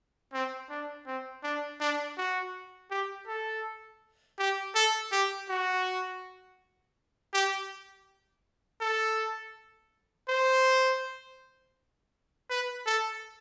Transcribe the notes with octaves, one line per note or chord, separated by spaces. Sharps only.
C4
D4
C4
D4
D4
F#4
G4
A4
G4
A4
G4
F#4
G4
A4
C5
B4
A4